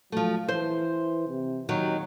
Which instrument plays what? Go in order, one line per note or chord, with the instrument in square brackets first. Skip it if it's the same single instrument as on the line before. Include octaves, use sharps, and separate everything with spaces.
[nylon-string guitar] F3 A3 [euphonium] F#3
[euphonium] E3 [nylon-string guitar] C5
[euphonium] C3
[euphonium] D#2 [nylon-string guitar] D#3 F#3